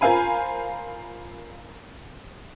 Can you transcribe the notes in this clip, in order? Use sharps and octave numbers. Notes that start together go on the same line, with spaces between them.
F4 A#4 C5 F5 G#5 B5